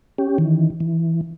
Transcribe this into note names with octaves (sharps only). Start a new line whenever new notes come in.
C#4 G4
D#3 E3
E3